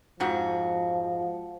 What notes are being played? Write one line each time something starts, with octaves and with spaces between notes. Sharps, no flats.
F2 G#2 F3 F#4